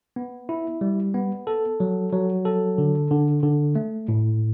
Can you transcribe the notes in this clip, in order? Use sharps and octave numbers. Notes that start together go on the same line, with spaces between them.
B3
E4
G3
B3
A4
F#3
F#3
A4
D3
D3
D3
A3
A2